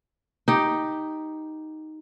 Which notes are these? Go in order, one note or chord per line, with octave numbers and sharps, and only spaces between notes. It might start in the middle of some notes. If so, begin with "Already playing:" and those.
D#4 G4